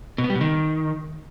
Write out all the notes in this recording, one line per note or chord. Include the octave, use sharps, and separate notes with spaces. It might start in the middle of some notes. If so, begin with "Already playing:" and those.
B2
B3
G3
B2
D#3